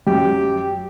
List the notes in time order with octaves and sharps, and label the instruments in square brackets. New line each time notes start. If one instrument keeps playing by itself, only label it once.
[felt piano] F#2 [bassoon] G4